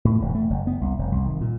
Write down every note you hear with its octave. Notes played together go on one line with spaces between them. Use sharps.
A2
E1
A3
F#1
B3
C2
F1
C2
D#3
A#2